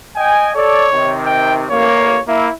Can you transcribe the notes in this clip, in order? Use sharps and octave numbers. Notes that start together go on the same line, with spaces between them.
D#5 G5 G#5
A4 C#5 D5
C3 D#3
G5
A1 A#3 C#5
A#3 E4